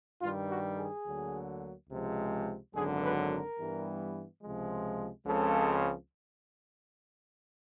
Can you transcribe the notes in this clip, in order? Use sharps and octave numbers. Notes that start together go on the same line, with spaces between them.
G2 D#3 G3 F4
F#4
G#4
D2 D3 F#3 A#3
C#2 C3 F3 G#3
G#1 F#2 D3 F#3 G#4
B4
A#4
G2 E3 G3 B3
C#2 C3 F3 G#3
C#2 C#3 F3 G#3 C4 A4